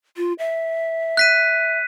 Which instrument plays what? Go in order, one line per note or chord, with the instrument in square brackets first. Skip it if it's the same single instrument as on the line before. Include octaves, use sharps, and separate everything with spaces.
[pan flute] F4
E5
[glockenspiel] F#6 B6 D#7